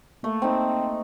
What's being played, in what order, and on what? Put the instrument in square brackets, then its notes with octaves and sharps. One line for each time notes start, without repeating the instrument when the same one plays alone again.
[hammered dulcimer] A3 [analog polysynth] A#3
[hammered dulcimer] C4 D#4